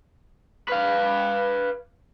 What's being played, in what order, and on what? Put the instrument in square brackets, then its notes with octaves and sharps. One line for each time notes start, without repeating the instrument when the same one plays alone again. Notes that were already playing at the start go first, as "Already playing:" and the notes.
[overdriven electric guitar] B4 F5